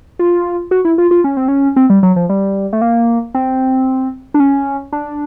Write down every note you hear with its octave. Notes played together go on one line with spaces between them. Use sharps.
F4
F#4
E4
F4
F4
C#4
C4
C#4
C4
G3
F#3
F3
G3
A3
A#3
C4
D4
C#4
D4